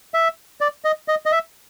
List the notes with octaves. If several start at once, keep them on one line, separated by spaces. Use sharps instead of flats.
E5
D5
D#5
D#5
D#5
E5